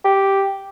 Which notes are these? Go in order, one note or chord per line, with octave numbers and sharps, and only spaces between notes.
G4